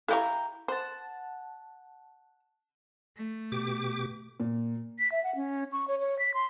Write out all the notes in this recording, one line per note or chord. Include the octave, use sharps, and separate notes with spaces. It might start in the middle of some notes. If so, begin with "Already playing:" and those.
E4 G4 A4 C#5 E5 F5 G5 A#5
C5 F#5 A5
A3
B2 G4 D6
A#2
B6
E5
F#5
C#4
C#6
C#5
C#5
B6
C6